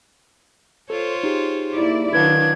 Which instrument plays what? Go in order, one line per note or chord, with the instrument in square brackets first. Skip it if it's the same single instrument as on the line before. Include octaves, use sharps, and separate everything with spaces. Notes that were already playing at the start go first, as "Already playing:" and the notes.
[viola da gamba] F4 C5 C#5 [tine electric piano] A4
[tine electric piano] D#4 G4 G#4
[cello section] A#3 E4 D5
[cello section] D#3 [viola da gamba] F#3 D4 [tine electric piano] E4 B4 F5 [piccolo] G#6